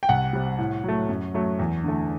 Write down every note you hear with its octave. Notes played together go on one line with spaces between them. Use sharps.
G5
C2 F#5
C3 G3
A2
F#3 A3
F#2
F#3 A3
E2
D3 A3